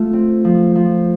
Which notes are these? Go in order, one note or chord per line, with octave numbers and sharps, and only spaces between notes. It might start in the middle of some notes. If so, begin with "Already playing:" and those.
Already playing: A3 F4
C4
F3
F3